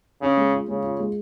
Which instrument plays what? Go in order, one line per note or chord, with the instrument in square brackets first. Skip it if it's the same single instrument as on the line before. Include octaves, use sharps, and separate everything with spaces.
[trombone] C#3 [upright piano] C#4
[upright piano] G#3
F4
[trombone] C#3 [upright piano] G#3
[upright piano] F4
G#3